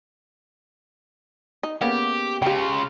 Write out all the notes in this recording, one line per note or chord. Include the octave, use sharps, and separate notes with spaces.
D#4
C#3 A#3 B3 G4
C#3 F4 G4 G5